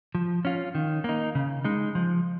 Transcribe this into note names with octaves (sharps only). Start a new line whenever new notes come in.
F3
C#4 F4
D#3
A#3 D#4
C#3
G#3 D#4
F3